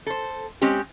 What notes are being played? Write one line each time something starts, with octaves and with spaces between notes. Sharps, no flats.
A4 C5
G#3 C4 C#4 G4